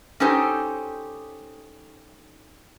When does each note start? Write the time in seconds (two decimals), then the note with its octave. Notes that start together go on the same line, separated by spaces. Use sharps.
0.20 C#4 D#4 G4 A4 C5